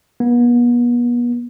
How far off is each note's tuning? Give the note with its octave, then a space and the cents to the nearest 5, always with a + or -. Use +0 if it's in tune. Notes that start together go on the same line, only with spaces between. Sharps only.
B3 -40